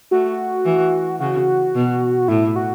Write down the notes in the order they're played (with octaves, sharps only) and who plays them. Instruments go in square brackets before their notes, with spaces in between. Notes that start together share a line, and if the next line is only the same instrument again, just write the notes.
[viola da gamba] A3 [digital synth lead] F#4
[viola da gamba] E3
[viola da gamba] C#3 [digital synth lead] F#4
[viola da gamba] B2
[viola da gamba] A2 [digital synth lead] E4
[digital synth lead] F#4